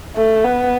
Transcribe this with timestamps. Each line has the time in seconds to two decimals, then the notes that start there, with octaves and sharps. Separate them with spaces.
0.15 A3
0.44 B3